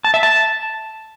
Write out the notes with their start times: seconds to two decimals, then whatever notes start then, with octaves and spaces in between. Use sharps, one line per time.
0.04 A5
0.14 E5
0.23 A5